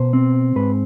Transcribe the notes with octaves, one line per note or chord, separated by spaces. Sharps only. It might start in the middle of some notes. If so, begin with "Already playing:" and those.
Already playing: B2 C5
C4
G#2 B4